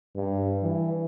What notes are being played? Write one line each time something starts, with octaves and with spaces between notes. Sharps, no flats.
G2
E3